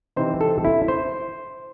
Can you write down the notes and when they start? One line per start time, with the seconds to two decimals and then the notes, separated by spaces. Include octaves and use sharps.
0.16 C3 E3 C4 D#4 C5
0.41 A4
0.65 E4
0.88 C5